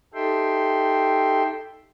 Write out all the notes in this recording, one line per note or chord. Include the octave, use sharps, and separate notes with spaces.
D#4 G4 A4 E5 G5 C6